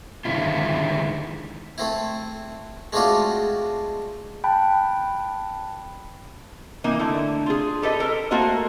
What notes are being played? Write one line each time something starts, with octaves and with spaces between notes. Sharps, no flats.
D3 D#3 F3 G#3 E4 F4
A3 C4 E4
G#3 A3 C4 D4 F4 F#4
G5 A5 B5 F#6
E3 A#3 D#4
D3 A3 E4
F4 G#4
G4 A4 B4 D#5
A4 A#4
A3 A#3 F#4 A#4 C5 D#5